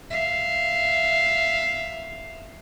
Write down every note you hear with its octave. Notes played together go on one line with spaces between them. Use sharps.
E5 F5